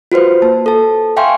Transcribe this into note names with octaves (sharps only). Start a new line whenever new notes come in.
F4 F#4 B4 C5
A#3 A5
A4 A5
E5 F5 G5 G#5 C6 C#6